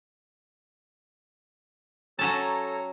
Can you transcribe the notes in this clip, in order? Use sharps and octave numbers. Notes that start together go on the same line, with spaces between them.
F#3 C#4 A4 C#5 A5 A#5